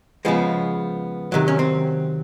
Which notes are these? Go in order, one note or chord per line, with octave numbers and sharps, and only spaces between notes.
C#3 F3 G#3 B3
C3 D#3 F#3
C#4
C4